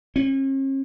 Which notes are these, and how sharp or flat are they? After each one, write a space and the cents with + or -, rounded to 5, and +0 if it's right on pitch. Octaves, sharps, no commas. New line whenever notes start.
C#4 -45